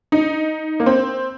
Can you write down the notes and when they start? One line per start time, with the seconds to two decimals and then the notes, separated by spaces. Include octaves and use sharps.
0.12 D#4
0.80 A#3
0.86 C4